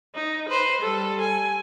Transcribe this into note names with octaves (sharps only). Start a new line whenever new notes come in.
D#4
B4 C5
G3 A4
G#5